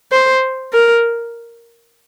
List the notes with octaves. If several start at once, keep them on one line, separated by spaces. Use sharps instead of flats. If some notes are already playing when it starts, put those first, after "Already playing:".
C5
A#4